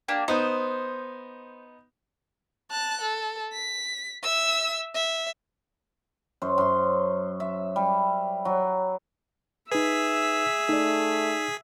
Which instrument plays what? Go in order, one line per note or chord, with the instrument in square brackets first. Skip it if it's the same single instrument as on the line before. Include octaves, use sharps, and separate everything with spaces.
[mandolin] A#3 D4 G4
[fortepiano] B3 D#4 [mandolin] C5
[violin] A5 F#6
A4
B6
E5 E6
E5
[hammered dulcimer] F#2 C5
F#2 C6
E5
G3
F#3
[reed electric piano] D#4 B4 [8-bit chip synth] G#4 B6 [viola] E5
[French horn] A3 [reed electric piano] D#4 D5